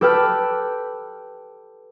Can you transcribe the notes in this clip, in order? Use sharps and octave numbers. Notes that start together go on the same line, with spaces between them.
G4 A4 B4 G5 A5 F6